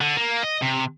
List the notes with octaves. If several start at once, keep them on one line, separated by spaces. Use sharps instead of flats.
D3
A#3
D#5
C3